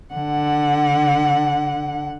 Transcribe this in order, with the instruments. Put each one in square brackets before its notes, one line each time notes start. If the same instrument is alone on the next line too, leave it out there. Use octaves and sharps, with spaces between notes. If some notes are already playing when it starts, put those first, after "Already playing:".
[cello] D3 F#5